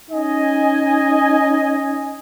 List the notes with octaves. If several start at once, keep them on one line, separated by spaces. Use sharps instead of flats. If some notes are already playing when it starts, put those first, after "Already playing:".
C#4 D#4 D#5 G#5